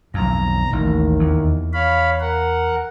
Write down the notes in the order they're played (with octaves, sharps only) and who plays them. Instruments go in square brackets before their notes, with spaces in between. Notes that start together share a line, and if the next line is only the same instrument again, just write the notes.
[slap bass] B1 F2 [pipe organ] A#5
[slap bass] A1 [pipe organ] D#2 D#3
[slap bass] E2
[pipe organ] C#5 F5 B5
A#4 F#5